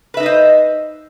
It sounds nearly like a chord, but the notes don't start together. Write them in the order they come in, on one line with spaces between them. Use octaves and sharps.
B4 E5 D#4 D#5 C5